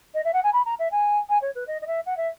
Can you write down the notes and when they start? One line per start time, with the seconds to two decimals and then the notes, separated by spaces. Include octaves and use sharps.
0.14 D#5
0.25 E5
0.33 F#5
0.44 G#5
0.53 B5
0.66 A#5
0.79 E5
0.91 G#5
1.29 G#5
1.42 C#5
1.55 B4
1.67 D#5
1.82 D#5
1.87 E5
2.06 F#5
2.17 E5